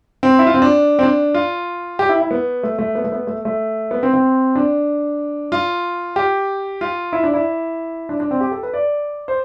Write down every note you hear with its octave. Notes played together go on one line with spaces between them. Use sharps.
C4
E4
F4
C4
D4
C4
D4
F4
G4
E4
E4
B3
A3
A3
B3
A3
B3
A3
A3
B3
C4
C4
D4
F4
G4
F4
E4
D4
E4
D4
D4
C4
G4
A4
B4
D5
C5